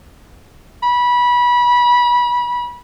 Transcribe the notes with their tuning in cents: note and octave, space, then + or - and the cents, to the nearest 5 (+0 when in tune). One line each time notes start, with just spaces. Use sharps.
B5 -20